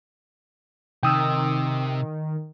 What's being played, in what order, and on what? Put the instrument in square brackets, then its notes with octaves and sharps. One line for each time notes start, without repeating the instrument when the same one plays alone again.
[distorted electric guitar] C3 [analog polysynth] D#3 [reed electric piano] G5 D#6 E6